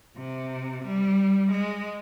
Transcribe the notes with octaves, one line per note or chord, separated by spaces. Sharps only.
C3
G3
G#3